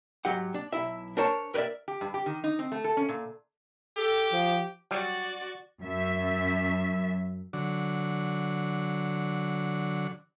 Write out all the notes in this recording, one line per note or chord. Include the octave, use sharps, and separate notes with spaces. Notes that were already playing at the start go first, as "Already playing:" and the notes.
G#2 F#3 G4 F#5
D4
B1 E4 E5
D4 A#4 C5 C#5 A5 A#5
A#4 B4 C#5 D5 E5
G4
G2
G4
D#3
D#4
C4
A3
A4
C#4
A#2
G4 A4
F3
F#3 G3 F#4 D5
F#2 E5
D3 F#3